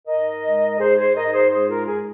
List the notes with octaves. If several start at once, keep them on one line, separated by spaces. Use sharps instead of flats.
G#2 A#4 D#5
G#3
G#2 G#4 C5
G#4 C5
G#2 A#4 D#5
G#4 C5
G#3 G#4 C5
F4 A#4
G#2 G#4